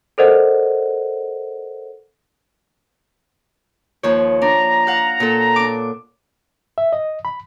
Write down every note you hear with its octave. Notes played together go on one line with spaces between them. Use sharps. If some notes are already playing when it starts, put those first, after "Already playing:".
A4 A#4 C5 D5 D#5 F#5
D#2 F3 C#5
D4 A#5
F5 F#5
A#2 A4
D4 D6
E5
D#5
B5